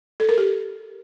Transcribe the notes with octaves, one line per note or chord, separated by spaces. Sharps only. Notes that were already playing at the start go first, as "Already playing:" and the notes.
A4
A#4
G4